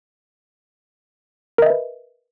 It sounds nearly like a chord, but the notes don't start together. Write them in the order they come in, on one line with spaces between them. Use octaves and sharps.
A#4 D#5 E5 B4